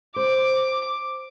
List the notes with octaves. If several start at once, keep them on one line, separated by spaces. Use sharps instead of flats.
C5 D6